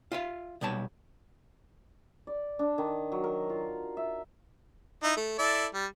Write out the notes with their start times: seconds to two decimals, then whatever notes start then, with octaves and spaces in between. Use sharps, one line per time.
0.12 F4 E5 F5
0.61 B1 B2 G3 C#5 A5
2.27 D5
2.59 D4
2.78 D#3
3.12 F#3
3.24 A#4
3.50 F4
3.97 E5
5.03 D#4 E4
5.17 A3
5.39 E4 A4 D5
5.74 G3